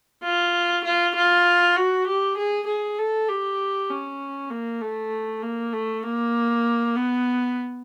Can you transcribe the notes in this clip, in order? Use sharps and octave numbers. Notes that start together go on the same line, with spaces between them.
F4
F4
F4
F#4
G4
G#4
G#4
A4
G4
C#4
A#3
A3
A#3
A3
A#3
B3